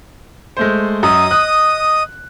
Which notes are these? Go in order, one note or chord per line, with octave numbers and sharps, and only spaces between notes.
G#3 A3 C5
F#2 D#5 D#6
F#6